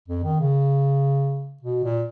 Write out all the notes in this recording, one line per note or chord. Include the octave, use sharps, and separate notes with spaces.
F2
D#3
C#3
B2
A#2